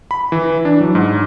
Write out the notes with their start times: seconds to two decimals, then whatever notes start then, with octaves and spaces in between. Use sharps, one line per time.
0.11 B5
0.32 E3
0.65 D4
0.80 F#3
0.95 G#2